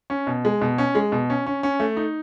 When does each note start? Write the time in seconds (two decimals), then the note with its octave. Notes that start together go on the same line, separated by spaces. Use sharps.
0.10 C#4
0.27 B2
0.45 G#3
0.61 B2
0.78 C#4
0.95 G#3
1.12 B2
1.30 C#4
1.46 C#4
1.63 C#4
1.80 A3
1.97 D#4